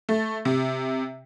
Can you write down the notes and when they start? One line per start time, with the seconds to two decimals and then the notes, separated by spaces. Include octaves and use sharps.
0.09 A3
0.45 C3